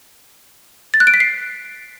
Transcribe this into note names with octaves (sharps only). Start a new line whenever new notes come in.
A6
F#6
D7
B6
C7